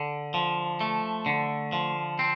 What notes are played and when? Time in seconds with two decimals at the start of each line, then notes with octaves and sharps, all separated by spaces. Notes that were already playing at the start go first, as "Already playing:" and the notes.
Already playing: D3
0.34 F3
0.81 A3
1.26 D3
1.72 F3
2.19 C4